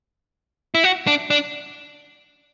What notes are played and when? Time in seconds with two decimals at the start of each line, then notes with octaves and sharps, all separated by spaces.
0.75 E4
0.84 F#4
1.07 D4
1.30 D4